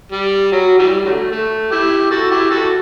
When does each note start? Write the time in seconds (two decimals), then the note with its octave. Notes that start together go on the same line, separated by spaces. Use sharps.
0.12 G3
0.52 F#3
0.79 E3 G3
1.05 D3 F#3 A3
1.31 A3
1.71 E4 G4
2.10 F#4 A4
2.31 E4 G4
2.51 F#4 A4